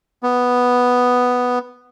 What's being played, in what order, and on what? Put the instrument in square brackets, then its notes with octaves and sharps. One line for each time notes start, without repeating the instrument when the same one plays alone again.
[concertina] B3